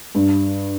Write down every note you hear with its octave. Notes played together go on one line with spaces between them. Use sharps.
G2